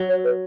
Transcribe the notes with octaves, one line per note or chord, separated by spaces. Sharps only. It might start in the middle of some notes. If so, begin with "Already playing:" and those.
Already playing: F#3
C#5
B4